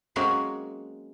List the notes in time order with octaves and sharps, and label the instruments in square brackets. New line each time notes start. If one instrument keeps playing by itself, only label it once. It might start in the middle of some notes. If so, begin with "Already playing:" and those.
[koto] F#3 G#3 A#3 C4 C#4 F#4